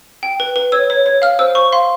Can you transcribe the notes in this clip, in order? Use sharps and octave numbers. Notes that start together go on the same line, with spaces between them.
G5
B4
B4
C#5 E6
C#5
C#5
F5 F6
C5 E6
C5 C#6
F5 C6